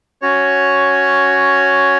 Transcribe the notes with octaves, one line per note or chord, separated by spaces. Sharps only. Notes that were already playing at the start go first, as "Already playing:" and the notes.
C#4 F#4 C#5